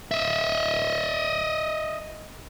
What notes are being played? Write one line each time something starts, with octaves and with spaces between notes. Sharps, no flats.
D#5 E5